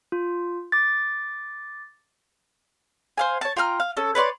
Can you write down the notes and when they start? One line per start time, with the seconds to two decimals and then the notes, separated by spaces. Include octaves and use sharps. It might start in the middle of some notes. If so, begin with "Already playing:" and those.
0.12 F4
0.72 D6 A6
3.18 C5 F5 G#5
3.41 C#5 A5
3.57 F4 G5 A#5 F6
3.80 F5
3.97 C#4 A4
4.15 B4 C#5 D5 C6